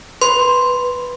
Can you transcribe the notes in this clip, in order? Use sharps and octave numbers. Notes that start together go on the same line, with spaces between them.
B4 C6